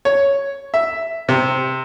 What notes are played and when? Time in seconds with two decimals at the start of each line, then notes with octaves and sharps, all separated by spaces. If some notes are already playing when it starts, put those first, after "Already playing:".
0.05 C#5
0.74 E5
1.29 C3